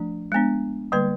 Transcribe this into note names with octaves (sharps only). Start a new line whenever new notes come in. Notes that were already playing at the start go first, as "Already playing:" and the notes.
Already playing: F3 A3 D4
G#3 B3 D4
D3 G3 A#3 B4